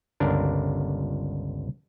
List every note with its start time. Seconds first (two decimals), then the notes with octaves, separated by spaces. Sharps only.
0.20 G1 C#2 D4 A#4